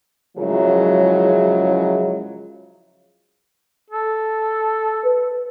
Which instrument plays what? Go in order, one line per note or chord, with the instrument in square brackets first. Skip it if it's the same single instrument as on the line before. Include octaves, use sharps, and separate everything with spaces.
[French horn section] F#2 C#3 F3 F#3 G#3 E4
[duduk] A4
[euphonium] B4